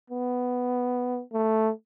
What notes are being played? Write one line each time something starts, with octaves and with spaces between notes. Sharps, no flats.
B3
A3